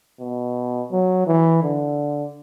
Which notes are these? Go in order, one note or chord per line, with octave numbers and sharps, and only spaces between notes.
B2
F#3
E3
D3